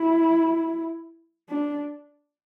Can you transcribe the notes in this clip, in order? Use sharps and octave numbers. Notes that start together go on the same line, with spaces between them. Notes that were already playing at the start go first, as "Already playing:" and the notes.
Already playing: E4
D4